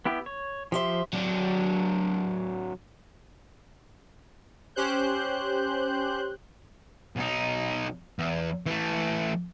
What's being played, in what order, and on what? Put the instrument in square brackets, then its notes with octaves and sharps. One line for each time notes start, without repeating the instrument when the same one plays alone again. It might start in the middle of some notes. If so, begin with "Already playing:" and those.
[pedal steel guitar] B3 E4 G4
C#5
[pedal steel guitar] F3 C6 [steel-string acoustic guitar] G4 C5 E5
[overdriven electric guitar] F#3 D4
[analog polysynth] C#4 G4 C5 F#6 G6
[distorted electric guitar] B1 D#4
E2
E3 A3